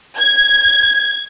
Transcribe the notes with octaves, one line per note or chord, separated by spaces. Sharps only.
G#6